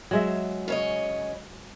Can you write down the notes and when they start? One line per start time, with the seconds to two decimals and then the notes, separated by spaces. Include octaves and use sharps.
0.11 F#3 G#3 E5
0.68 C#3 C#5 D#5